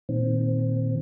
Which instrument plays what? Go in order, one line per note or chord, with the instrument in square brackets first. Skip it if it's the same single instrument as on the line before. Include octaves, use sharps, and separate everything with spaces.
[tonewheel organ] A#2 D#3 C4